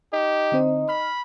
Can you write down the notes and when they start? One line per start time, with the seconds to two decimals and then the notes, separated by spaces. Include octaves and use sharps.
0.13 D#4 G4
0.52 D3 C4 C5
0.89 B5 F6